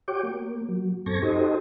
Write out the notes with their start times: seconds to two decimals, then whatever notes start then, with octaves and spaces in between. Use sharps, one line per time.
0.08 F#4 G4 C#5 G5 D6
0.23 A#3
0.69 F#3
1.06 F#2 C4 A4 C#6 G#6 A#6
1.22 D#4 F#4 G4 A4 C5 D#5